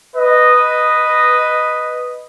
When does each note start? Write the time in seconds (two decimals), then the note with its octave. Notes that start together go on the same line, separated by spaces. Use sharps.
0.15 B4 D#5